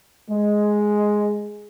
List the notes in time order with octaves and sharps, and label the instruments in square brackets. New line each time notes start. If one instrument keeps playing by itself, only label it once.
[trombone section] G#3